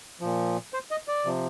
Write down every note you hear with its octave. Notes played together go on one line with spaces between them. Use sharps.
A#2 F3
C5
D#5
D5
C3 F3